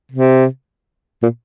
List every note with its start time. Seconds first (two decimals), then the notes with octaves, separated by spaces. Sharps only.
0.12 C3
1.23 A#2